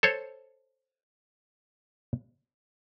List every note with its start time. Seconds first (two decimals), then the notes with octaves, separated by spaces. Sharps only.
0.03 A4 C5 C#5